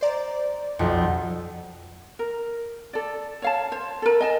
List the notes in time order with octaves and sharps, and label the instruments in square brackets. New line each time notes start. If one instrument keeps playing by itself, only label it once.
[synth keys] C5 D5 A#5
[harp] B1 F2
[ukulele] A#4
A4 D5
C#5 F5 A5
C5
A4 A#4
D#5 G#5 A5